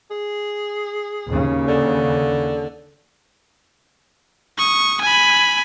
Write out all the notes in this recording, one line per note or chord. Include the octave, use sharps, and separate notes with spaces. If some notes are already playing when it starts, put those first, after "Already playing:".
G#4
D#2 C#3
D3
C#6 D#6
G#5 B5